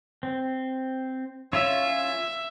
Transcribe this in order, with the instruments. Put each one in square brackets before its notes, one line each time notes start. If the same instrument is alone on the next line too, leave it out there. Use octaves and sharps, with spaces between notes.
[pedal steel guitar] C4
[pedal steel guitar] C#4 F4 C#5 [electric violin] E5